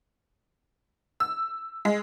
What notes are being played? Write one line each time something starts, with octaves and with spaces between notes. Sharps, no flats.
E6
G#3